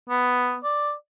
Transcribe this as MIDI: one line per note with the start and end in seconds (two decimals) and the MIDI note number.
0.10 0.58 59
0.64 0.93 74